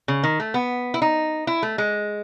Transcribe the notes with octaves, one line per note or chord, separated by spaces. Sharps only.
C#3
D#3
A3
B3
E4
D#4
E4
A3
G#3